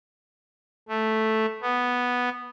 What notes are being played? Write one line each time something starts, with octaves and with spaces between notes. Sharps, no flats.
A3
B3